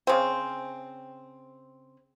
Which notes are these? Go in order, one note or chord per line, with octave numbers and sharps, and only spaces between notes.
C#3 C4